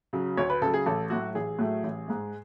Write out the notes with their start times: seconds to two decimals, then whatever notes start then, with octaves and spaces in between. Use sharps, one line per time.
0.13 C#3 F#3
0.37 D2 C#5
0.50 B4
0.61 C#3 A4
0.66 F#3
0.74 G#4
0.86 A1 A4
1.10 A2 F#3 A3 F#4
1.35 A1 G#4
1.59 A2 F#3 A3
1.83 A1
2.08 G#2 G#3